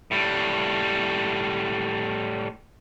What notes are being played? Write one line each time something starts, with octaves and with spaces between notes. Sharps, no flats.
A2 G3